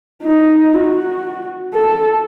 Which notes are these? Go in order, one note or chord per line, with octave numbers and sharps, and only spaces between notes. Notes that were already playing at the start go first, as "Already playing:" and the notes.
D#4
F#4
A4